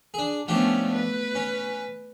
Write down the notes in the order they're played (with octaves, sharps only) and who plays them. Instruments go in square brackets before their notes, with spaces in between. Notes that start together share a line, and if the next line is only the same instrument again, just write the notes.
[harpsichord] D4 G#4
[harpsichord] F3 D4 G4 [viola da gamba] A3 B3 C#4
[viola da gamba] B4
[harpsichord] C#4